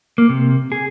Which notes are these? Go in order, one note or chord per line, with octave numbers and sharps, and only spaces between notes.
A#3
C3
G#4